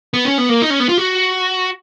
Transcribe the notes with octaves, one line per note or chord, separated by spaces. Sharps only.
B3
C#4
B3
A#3
D#4
C#4
B3
F4
F#4